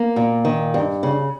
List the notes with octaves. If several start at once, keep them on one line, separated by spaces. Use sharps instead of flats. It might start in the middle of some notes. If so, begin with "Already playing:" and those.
Already playing: A#3
A#2
D#3
G2
C#3